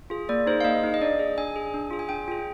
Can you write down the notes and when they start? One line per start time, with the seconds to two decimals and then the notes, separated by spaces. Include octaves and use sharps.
0.10 F4 G#4
0.29 A#3 D5
0.47 D#4 G#4 C5
0.61 F5
0.64 A#3 D#5
0.84 D#4 G#4
0.94 D#5
1.01 D4 D5
1.19 G#4
1.38 D4 G#5
1.56 G#4
1.74 D4
1.91 F4 G#4
1.99 G#5
2.09 D4 G5
2.28 F4 G#4